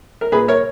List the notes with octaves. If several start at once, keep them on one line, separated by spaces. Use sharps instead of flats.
A#4
A#2 G#4 B4
A#4 C#5